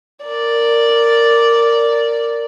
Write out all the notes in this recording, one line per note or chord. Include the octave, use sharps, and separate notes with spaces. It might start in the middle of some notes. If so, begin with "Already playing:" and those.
A#4 D5